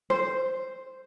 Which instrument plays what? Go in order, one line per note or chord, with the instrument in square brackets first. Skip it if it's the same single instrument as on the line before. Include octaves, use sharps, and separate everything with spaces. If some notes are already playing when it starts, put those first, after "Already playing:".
[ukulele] C5